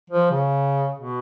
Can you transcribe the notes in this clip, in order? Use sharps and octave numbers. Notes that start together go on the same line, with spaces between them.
F3
C#3
B2